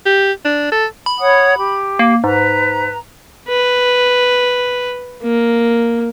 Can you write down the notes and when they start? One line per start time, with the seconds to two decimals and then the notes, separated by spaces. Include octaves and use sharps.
0.06 G4
0.45 D4
0.72 A4
1.06 B5
1.19 C#5 F#5 D#6
1.58 G4
1.99 A#3
2.24 G#2 B4 A#5
3.48 B4
5.23 A#3